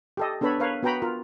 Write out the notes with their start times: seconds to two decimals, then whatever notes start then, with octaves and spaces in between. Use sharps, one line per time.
0.17 G4 A4 D#5
0.41 B3 D4 A4 B4 C#5 B5
0.60 A#4 B4 C#5 F5
0.83 B3 F#4 B4 G5 A#5 B5
1.02 F4 A#4